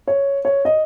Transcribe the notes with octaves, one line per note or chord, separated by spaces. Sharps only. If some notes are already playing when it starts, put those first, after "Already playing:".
C#5
C#5
D#5